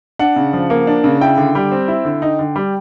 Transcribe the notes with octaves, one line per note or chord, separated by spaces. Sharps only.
D4 F#5
C#3
F3
A#3
D4
C#3
E4 G5
D3
G3
C4
E4
D3
D#4
D3
G3